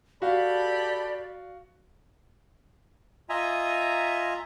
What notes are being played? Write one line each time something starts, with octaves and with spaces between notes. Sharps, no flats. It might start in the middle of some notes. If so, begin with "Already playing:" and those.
F#4 G4 A4 D5 F5 B5
F4 D#5 E5 G#5 A#5